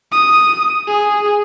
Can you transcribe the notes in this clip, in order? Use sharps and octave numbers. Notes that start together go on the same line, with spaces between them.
D#6
G#4